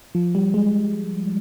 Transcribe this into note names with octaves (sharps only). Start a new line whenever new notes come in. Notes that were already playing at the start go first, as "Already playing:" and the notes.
F3
G3
G#3